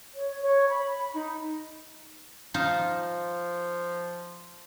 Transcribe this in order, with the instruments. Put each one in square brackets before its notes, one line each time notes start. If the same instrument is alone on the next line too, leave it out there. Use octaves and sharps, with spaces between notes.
[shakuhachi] C#5
C#5
B5
D#4
[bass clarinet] F3 [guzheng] D#4 F4 C5